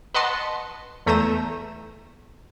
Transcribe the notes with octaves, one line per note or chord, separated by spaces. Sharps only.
B4 D#5 F#5 A5 C6
E2 A3 A#5 G6 D#7 E7